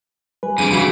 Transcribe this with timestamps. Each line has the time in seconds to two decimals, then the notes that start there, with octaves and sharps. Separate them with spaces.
0.43 G3 B4 G#5
0.58 F2 E3 D4 G#4 D7 D#7
0.72 C#3 E3 G3 F#4 F5